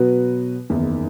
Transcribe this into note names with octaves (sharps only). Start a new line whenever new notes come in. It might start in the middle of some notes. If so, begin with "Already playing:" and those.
Already playing: B2 F#3 B3 F#4 B4
F#1 E2 D#3